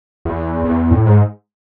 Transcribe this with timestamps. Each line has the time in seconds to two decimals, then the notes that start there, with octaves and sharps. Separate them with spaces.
0.25 E2
0.65 E2
0.91 A2
1.05 G#2